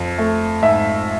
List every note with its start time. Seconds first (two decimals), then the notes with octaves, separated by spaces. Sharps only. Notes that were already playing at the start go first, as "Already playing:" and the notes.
Already playing: F2
0.18 A3
0.62 G#2 E5